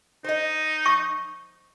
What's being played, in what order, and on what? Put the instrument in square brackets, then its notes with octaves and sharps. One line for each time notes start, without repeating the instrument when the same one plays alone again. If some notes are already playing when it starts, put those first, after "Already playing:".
[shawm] D#4 [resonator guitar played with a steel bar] C5 D#5
[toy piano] C#6